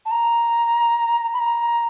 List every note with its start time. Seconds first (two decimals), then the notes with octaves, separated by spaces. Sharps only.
0.06 A5
0.11 A#5
1.34 B5
1.40 A#5